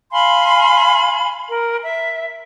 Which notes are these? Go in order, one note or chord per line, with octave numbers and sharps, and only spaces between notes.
F5 G#5 B5 C6
A#4
E5